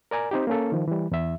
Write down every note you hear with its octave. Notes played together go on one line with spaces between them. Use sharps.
A#4 D5 G#5 A#5
C4 D#4 G4
A#3 C#4 A4
D#3 F3
E3 G3
E2 E5